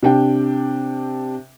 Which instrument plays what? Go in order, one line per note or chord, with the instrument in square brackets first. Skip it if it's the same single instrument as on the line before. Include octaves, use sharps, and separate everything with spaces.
[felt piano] C3 D4 G5